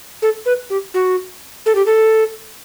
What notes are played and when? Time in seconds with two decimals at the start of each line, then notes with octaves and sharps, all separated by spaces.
0.22 A4
0.46 B4
0.70 G4
0.94 F#4
1.66 A4
1.75 G4
1.86 A4